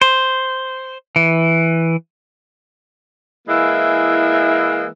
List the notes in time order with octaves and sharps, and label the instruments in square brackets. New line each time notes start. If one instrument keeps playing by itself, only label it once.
[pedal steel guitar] C5
E3
[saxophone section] E3 G#3 A#3 E4